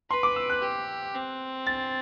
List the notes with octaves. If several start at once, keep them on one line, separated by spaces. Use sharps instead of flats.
B4 C6
D6
E6
F#6
G4
C4
A6